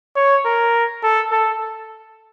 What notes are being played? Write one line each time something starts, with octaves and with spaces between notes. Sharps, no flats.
C#5
A#4
A4
A4